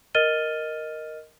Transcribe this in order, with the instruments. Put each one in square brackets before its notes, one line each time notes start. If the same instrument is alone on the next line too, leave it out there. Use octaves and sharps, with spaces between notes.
[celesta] A#4 D#5 F6 A6 D#7 G7